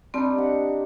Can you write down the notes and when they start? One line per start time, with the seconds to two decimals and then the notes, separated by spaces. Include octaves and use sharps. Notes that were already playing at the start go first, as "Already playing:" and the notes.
0.14 G3 C4 D4 D#4
0.38 C3 F#5